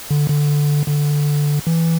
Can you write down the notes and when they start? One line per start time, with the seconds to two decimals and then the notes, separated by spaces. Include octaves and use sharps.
0.11 D3
0.30 D3
0.88 D3
1.67 E3